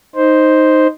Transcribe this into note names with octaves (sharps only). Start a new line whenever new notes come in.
D#4 C5